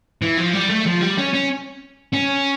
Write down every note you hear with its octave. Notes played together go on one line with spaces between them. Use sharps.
E3
F3
G3
A3
F3
G3
C#4
C#4
C#4